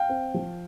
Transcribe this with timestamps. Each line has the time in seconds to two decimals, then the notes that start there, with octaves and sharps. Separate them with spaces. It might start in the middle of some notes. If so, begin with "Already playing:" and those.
Already playing: F5 G5
0.09 C4
0.34 F3